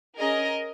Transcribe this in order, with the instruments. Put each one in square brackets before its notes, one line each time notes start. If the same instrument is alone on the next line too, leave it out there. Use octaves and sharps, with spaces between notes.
[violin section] C#4 G#4 A#4 D#5